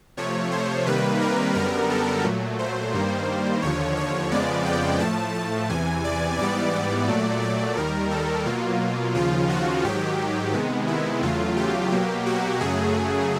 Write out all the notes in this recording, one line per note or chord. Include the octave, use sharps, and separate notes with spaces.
C3 F3 A3 C#5
C5
C3 D#3 G3 A#3 B4
A#4
F#2 D3 G3 B3 A#4
A4
A#2 F#3 A3
C5
G2 D#3 G3 A#3
D#2 D3 F3 C#5
C#5
F2 C#3 F3 G#3 B3 D5
G5
A2 F3 A3 A5
A5
E2 C3 E3 G#5
D5
G#2 E3 G3 B3 D5
D5
A#2 F#3 A3
D5
D#2 D#3 G3 A#4
A4
B2 F#3 A#3 F4
D#2 C#3 F3 F4
F#4
G#2 D#3 F#3 G4
C3 D#3 G#3 B3
E4
E2 C#3 F#3 A3 F4
G4
B2 F#3 A#3
F#4
F#2 C#3 F#3 A3 G#4